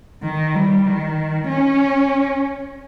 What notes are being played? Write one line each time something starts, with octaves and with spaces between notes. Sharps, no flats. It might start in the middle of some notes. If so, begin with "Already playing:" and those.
D#3
G3
D#3
C#4